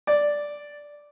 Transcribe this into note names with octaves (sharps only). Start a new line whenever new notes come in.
D5